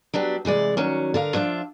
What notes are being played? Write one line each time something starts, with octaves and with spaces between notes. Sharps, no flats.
F#3 B3 D4 G4
C3 E3 G#3 D5
D#3 F#3 C#4
D3 A#4 F5
F3 D4 F4 E5